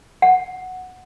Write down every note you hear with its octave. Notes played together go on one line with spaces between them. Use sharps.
F#5